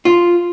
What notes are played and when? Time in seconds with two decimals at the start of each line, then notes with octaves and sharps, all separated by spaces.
0.05 F4